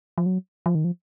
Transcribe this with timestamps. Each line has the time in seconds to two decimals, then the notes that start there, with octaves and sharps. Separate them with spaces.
0.18 F3
0.26 F#3
0.66 F3
0.75 D#3
0.84 F3